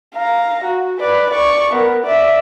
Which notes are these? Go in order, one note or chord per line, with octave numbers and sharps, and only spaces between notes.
F5 A#5
F#4
B4 D5
D5 C#6
B3 A#4
D5 E5